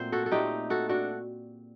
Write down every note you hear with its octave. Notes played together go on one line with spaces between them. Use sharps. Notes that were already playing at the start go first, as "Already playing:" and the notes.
Already playing: A#2 F#3 A3 C4 C5
F#4 A4
A4
A#2 A3 C4 D#4 G4
F#4 A4
D4 F#4